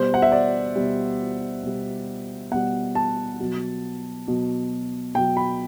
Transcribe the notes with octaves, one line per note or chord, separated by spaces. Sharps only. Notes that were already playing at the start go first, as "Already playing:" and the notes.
Already playing: B2 G3 C5
F#5
E5
D5
B2 G3
B2 G3
B2 G3 F#5
A5
B2 F#3
B2 F#3
B2 F#3 G5
B5